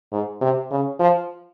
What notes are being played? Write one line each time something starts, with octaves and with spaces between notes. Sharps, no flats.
G#2
C3
C#3
F3